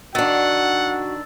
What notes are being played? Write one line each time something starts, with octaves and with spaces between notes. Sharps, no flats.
D#3 D4 F#4 F#5 E6 A6